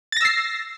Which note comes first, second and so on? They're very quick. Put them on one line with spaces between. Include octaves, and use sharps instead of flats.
A6 A#6 E6 C7